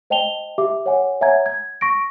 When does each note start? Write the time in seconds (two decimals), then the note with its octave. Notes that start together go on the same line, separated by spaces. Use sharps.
0.10 C5 D#5 G5 A5 F7 G7
0.58 G4 E5 D6
0.86 C#5 F#5 G#5
1.21 C#5 E5 F#5 G#5 A#5 G#6
1.46 G#6
1.81 C#6 A#6 D7